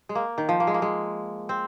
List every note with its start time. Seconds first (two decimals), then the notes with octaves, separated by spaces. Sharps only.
0.09 G#3
0.15 A#3
0.38 D#3
0.49 F3
0.60 A#3
0.67 G#3
0.74 A#3
0.82 G#3
1.49 C4